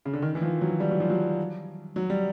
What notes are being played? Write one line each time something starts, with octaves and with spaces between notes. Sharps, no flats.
C#3
D3
D#3
E3
F3
F#3
G3
F#3
F3
F#3
F#3
G3